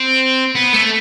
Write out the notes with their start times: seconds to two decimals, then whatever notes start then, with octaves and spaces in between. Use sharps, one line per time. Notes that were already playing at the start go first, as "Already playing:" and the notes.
Already playing: C4
0.55 B3
0.73 A3